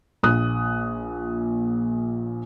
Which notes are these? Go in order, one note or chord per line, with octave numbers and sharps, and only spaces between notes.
A#1 A#2 D#6 F#6